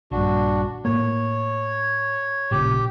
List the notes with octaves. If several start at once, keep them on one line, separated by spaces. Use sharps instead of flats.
A#1 G2 D4 F#4
A2 A#3 C#5
A1 A#2 C#3 G4